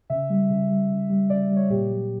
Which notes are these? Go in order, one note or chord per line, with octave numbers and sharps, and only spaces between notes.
C#3 E5
G3
C#3
G3
C#3
G3
C#3 D5
G3
C#5
A#2 G4
F#3